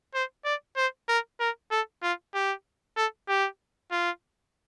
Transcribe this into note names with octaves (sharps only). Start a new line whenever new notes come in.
C5
D5
C5
A#4
A#4
A4
F4
G4
A4
G4
F4